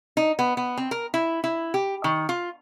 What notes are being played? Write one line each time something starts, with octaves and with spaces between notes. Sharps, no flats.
D#4
B3
B3
C4
A#4
E4
E4
G4
D#3
F4